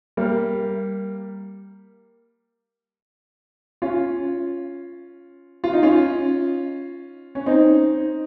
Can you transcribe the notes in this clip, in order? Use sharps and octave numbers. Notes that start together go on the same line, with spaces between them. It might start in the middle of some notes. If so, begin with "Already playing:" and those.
G3 A#3
C#4 F4
F4
D#4
C#4 F4
C#4
C4 D#4